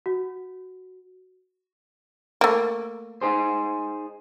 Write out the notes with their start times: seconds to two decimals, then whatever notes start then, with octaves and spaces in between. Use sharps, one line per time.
0.06 F#4
2.41 A3 A#3
3.22 D#4 G#4 C5